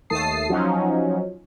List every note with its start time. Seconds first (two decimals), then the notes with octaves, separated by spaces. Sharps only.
0.10 D#2 A3 A5 D#6 C7
0.49 F3 F#3 C#4 D#4